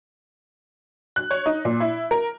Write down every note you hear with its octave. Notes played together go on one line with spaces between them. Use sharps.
F#6
C#5
D#4
A#2
E4
A#4